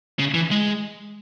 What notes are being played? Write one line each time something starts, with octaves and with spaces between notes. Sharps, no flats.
C#3
E3
G#3